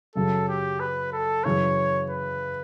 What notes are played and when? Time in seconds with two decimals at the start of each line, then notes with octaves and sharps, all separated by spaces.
0.15 F#2 C#3 F#3 A4
0.48 G4
0.80 B4
1.13 A4
1.44 F#2 C#3 E3 C#5
2.10 B4